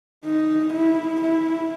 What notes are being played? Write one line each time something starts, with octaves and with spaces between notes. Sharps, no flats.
D#4
E4
E4